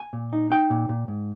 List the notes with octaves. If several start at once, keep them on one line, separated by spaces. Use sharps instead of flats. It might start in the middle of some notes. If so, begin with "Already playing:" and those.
Already playing: G#5
A#2
D#4
D#4 G5
A#2
A#2
G#2